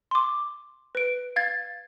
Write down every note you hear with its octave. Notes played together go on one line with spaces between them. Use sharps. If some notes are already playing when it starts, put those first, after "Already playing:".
C6 D6
B4 D7
F5 G#6 A6